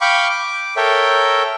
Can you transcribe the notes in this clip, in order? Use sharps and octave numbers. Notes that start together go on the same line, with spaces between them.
F5 G5 B5 C#6 D6
D6
A4 A#4 C#5 E5 G5